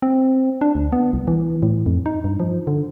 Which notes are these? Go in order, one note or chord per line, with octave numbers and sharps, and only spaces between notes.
C4
D4
D2
B3
C2
E3
A2
F2
D#4
G2
F3
D3